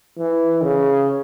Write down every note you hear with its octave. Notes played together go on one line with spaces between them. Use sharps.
E3
C#3